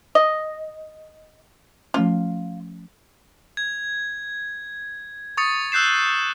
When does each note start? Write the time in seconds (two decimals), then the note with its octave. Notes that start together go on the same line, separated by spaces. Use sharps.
0.15 D#5
1.94 F3 A3 C#4 F4
3.57 G#6
5.37 C#6 D#6 A6 C#7
5.72 E6 F#6 G6 C7 E7